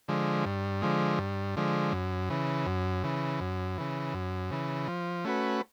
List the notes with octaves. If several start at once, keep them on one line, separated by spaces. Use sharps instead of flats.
D3 F3 G#3
G2
D3 F3 G#3
G2
D3 F3 G#3
F#2
C#3 E3
F#2
C#3 E3
F#2
C#3 E3
F#2
C#3 E3
F3
A3 C#4 F#4 B4